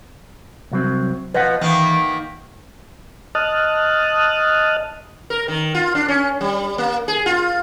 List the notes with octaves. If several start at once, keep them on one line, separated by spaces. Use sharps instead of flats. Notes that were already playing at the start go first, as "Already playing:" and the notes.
C2 F#3 C4
F3 B4 D#5 F#5
D#3 E3 A#3 B3
D#5 A5 D#6 F6 F#6
A#4
D#3
F4
D4
C#4
G3
A#3
G#4
F4